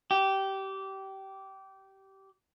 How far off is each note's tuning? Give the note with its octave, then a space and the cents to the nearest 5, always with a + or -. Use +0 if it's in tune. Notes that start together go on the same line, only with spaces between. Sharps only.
G4 -20